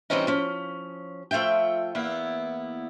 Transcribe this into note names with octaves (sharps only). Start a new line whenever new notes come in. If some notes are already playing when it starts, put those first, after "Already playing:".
E3 G3 A#3 C4 C#4 D#4
F3 C#4
F3 A3 F4 E5 G5
E2 A#3 B3 E4